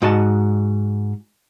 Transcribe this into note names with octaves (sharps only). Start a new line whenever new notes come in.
G#2 F#4 D#5 A5